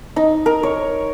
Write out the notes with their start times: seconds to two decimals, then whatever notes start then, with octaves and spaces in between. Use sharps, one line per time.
0.16 D#4
0.46 A#4
0.63 C#5